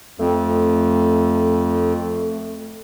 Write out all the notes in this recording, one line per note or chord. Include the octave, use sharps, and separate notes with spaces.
F2 A3